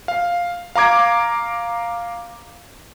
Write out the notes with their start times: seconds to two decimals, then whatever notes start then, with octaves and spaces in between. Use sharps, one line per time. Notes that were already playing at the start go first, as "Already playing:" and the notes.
0.08 F5
0.75 F5 A#5 D6 G#6 D7